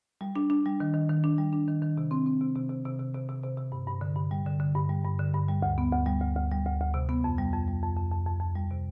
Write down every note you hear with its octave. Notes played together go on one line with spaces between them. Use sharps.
G3
D4
D4
G3
D#3
D#3
D#3
D4
G3
D4
D#3
D#3
C3
C4
C4
C3
C3
C3
C3
C3
C3
C3
C3
C3
G2
G2
D3
G2
G3
D3
D3
G2
G3
G2
D3
G2
G3
D2
B3
D2
G3
D2
D2
G3
D2
D2
C3
B3
F2
G3
F2
G3
F2
F2
F2
F2
F2
G3
C3